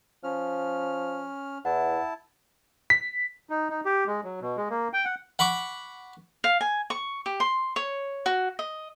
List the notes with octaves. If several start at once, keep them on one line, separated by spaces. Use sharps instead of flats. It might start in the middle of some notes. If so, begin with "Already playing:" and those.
F3 C#4 F6
E2 E4 F#5 A5
B6
D#4
D#4
G4
G#3
F#3
B2
G#3
A#3
G5
F#5
F#5 B5 C#6 D6
F5
G#5
C#6
G4
C6
C#5
F#4
D#5